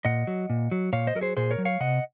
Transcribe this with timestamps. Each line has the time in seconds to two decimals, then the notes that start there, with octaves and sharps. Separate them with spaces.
0.05 A#2 D#5 F#5
0.27 F#3
0.50 A#2
0.71 F#3
0.93 A#2 C#5 F5
1.07 C5 D#5
1.15 F#3 A#4
1.21 G#4 C5
1.37 A#2 G#4 C5
1.51 A#4 C#5
1.58 F#3
1.65 C#5 F5
1.80 C3 D#5 F#5